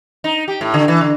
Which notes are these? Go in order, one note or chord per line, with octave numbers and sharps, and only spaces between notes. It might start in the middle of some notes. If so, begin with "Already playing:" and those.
D#4
G4
A2
D3
E3
D3